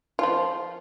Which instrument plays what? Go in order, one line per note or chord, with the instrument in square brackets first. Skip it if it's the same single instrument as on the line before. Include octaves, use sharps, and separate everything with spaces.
[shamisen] F3 F4